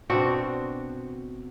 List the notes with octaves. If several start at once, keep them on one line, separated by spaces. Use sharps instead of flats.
B2 C4 D4 F#4